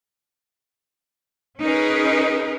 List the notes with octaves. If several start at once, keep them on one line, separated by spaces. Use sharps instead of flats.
C#4 D#4 G#4 A#4 B4